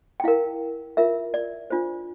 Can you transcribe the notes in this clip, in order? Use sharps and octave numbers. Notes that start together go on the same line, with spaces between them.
G5
E4 A#4 F5
F4 A#4 E5
D5
D4 F4 C5